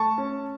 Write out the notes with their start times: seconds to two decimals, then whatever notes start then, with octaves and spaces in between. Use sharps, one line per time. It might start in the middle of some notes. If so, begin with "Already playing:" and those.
Already playing: A3 A5 C#6
0.18 C#4